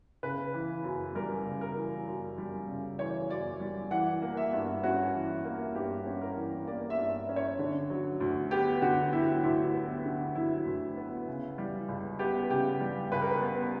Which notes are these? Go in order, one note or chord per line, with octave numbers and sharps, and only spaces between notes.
C#3 B4
E3
F#2
G3 A#4
C#3
A#4
E3
F#2
G3
C#3
E3 C#5
F#2 D5
G3
E3 F#5
A#3
E5
G2
C#4 F#4
E3
A#3
G2 G4
C#4
A#4
E3
A#3 D5
E5
G2
C#4
C#5
D3
F#3
D2
B3 G4
D3 F#4
F#3 E4
D2 E4
B3
D3
F#3 E4
D2
B3
C#3
G3
C#2
B3 G4
C#3 G4
G3
C#2 B4
A#4
B4
B3